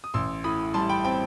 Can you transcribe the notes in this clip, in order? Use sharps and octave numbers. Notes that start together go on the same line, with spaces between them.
D#6
A1 C6 E6
A2 B5 D#6
G3 A5 C6
G5 B5
C4 G5 B5